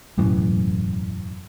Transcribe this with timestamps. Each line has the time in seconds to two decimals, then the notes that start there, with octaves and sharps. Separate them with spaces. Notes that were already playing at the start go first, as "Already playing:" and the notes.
0.18 E1 F#2 A2 E3